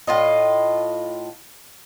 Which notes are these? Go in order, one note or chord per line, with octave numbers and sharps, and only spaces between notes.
A2 F4 D#5